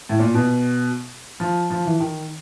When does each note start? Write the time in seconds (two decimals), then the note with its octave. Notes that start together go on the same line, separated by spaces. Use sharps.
0.09 A2
0.19 A#2
0.34 B2
1.40 F3
1.70 F3
1.85 E3
2.00 D#3